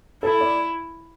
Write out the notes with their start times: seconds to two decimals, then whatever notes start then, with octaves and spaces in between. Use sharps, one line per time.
0.23 E4 A4
0.41 D5